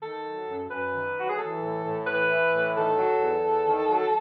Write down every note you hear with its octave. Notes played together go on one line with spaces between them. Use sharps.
D#3 A4
F#3
F#2
F#2 B4
D#3
F#3 F#4
G#4
E3 A4
A2
A2
E3 B4
E3
A2
D#3 A4
F#3
E2
E2
D#3
F#3